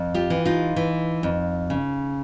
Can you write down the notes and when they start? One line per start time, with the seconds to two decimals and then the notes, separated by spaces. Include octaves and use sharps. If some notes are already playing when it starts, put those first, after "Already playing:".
Already playing: F2
0.14 F4 G4
0.30 E3
0.45 D#4 F4
0.76 E3
1.23 F2
1.70 C#3